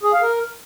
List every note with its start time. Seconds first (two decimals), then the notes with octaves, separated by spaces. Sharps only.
0.03 G#4
0.13 F5
0.22 A#4